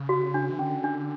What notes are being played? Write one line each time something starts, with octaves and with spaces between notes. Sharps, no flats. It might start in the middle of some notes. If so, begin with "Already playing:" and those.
Already playing: C#3
F#4
D4
E3
D3 C#4
D4